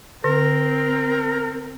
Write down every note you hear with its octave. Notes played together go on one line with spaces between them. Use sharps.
D3 C4 A#4